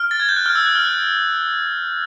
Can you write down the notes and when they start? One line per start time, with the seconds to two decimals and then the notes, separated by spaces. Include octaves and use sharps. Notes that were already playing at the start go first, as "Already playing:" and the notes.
Already playing: F6
0.11 A6
0.20 G#6
0.29 G6
0.36 F#6
0.46 F6
0.55 E6
0.66 F#6
0.75 F6
0.85 F#6